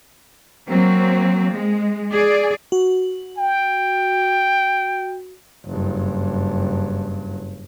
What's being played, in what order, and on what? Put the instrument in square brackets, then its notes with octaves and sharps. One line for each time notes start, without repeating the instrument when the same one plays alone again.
[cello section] F#3 A#3 C4
G#3
G#4 D5
[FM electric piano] F#4
[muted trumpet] G5
[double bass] F#1 G2